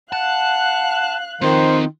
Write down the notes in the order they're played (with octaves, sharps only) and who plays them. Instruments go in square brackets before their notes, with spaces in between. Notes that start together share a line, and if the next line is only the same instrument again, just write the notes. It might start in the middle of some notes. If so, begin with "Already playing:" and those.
[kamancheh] F5 F#6 [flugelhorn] F#5 [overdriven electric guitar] A5
[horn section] D#3 [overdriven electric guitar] C4 F4 [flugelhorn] C5